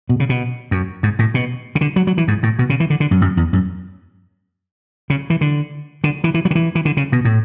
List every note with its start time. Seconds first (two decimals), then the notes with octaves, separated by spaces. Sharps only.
0.09 B2
0.20 C#3
0.29 B2
0.71 F#2
1.03 G#2
1.19 A2
1.34 B2
1.75 C#3
1.81 D3
1.96 F#3
2.07 F#3
2.18 E3
2.28 G#2
2.43 A2
2.59 B2
2.70 C#3
2.80 E3
2.90 D3
3.00 D3
3.11 F#2
3.21 F#2
3.37 E2
3.53 F#2
5.10 C#3
5.30 E3
5.41 D3
6.04 D3
6.24 E3
6.34 E3
6.45 F#3
6.51 D3
6.55 E3
6.75 E3
6.85 D3
6.97 C#3
7.12 B2
7.25 A2